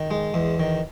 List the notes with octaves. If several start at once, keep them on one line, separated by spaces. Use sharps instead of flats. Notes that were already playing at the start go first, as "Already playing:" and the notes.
Already playing: D#3
G#3
E2
D#3